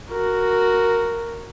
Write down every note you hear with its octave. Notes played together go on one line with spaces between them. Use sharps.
F#4 A#4